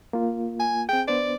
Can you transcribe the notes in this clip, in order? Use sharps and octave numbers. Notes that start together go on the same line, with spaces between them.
A#3 F4
G#5
C4 G#4 G5
B3 D4 C5 D5